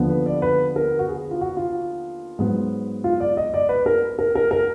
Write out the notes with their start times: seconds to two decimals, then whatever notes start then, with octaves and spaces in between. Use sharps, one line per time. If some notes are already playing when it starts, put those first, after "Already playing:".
Already playing: D#2 D3 F3 B3
0.10 B4
0.26 D5
0.42 B4
0.76 A#4
0.99 F#4
1.08 G#4
1.31 F4
1.41 F#4
1.57 F4
2.39 G#2 F#3 B3
3.04 F4
3.20 D5
3.37 D#5
3.54 D5
3.69 B4
3.86 A#4
4.19 A#4
4.35 A#4
4.51 A#4